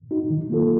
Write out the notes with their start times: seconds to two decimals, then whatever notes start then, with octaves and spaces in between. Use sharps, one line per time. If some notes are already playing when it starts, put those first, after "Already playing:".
0.11 D#4 F#4
0.30 D#3
0.50 A#3 F4 A4